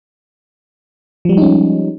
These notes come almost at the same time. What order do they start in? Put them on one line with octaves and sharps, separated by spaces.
F3 G3 G#3 D#4 C#4